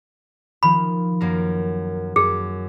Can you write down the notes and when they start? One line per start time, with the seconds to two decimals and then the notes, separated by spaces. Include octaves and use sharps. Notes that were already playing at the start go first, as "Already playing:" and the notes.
0.63 D#3 F3 B5
1.21 F#2 A#3 A#4
2.16 F#2 G#4